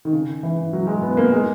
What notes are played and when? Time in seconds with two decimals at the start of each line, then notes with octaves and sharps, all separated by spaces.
0.05 D#3
0.13 C#3
0.43 E3
0.73 F#3
0.87 G#3
1.02 B3
1.14 B3
1.17 A#3
1.32 G#3